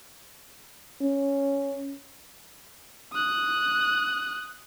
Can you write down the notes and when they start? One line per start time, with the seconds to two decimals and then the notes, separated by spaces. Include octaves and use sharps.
1.02 C#4
3.13 D#6 F#6